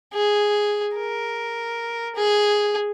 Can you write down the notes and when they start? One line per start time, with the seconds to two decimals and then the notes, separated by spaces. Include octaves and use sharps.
0.14 G#4
0.96 A#4
2.16 G#4